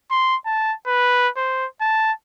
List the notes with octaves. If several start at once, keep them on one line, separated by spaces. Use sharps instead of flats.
C6
A5
B4
C5
A5